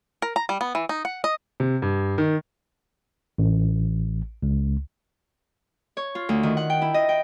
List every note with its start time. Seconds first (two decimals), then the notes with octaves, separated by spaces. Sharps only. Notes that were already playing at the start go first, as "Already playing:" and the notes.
0.22 A#4
0.36 A#5
0.49 G3
0.61 B3
0.75 E3
0.89 D#4
1.05 F#5
1.24 D#5
1.60 C3
1.82 G2
2.18 D#3
3.38 A1
4.43 C#2
5.97 C#5
6.15 F4
6.29 D2
6.43 D#3
6.57 F#5
6.70 G5
6.81 E4
6.94 D#5
7.09 G5